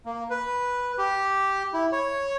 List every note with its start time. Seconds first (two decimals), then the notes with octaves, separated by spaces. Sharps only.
0.05 A#3
0.30 B4
0.98 G4
1.74 E4
1.92 C#5